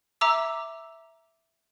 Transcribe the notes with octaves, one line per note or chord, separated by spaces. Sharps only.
E5 A#5 D6 E6